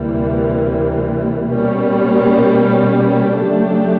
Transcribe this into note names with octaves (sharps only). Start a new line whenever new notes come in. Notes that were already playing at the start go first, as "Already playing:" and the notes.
Already playing: D2 C3 E3 G3 A#3
B2 G3 A#3 C#4
C#3 F#3 A3 D4 G4